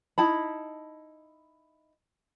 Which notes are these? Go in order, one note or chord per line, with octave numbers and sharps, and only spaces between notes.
D#4 E4 A5 B5